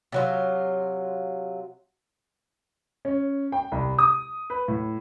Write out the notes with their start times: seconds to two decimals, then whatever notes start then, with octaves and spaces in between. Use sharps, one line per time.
0.12 C3 F#3 F4
3.05 C#4
3.52 G5
3.72 C2
3.99 D#6
4.50 B4
4.68 A2